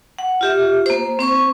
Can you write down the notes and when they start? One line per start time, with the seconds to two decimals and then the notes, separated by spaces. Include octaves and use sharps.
0.19 F#5
0.41 F4 G4 E5
0.86 A#3 C5
1.19 C4 C5 C#6